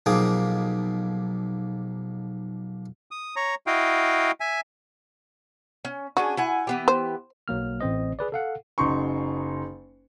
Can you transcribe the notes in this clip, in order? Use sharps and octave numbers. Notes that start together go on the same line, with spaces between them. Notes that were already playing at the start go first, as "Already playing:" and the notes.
B1 F3 A#3 G#4 D6
D#6
C#5 A#5
E4 F#4 D#5 F5 G5
E5 G#5
C#4
C#4 D4 F#4 G#4
E4 F#5 G#5
E3 B3 G4
C5
B1 F#3 A#3 F6
A1 C4 C5 D#5
G#4 B4 D5
A4 F5 F#5
F#1 F#2 D#4 C6 C#6